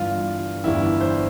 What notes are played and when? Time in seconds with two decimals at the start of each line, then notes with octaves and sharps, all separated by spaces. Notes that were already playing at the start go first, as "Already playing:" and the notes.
Already playing: G1 G2 E3 F4
0.64 G1 G2 E3 E4
1.01 C5